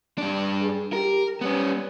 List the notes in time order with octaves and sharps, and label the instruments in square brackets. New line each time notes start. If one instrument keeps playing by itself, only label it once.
[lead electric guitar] G2 D4
[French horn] G#4
[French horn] G4 [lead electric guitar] A#4
[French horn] G3 [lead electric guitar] B3 C#4